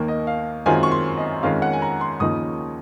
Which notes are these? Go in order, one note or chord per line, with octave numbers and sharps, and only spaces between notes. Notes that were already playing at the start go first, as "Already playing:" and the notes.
Already playing: D#2 D#3 A#3
D#5
F5
F#2 D#3 G#3 C4 F4 G#5
C#6
C6
D#5
F2 D#3 G#3 C#4 F5
F#5
G#5
A#5
C6
D#2 C#3 F3 A#3 D#4 D#6